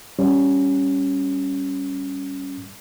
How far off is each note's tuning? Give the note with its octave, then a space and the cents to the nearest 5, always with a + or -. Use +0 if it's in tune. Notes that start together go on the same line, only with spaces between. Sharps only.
G3 +0 C#4 +0